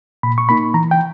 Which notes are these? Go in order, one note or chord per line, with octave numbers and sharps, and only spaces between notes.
A#2 B5
C#6
A#3 D#4 B5
E3 A#5
G5